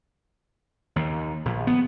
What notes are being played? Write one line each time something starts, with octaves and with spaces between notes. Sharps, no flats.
D#2
A#1
B3